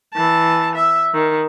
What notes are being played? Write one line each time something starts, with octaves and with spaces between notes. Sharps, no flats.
E3 A5
E5
D#3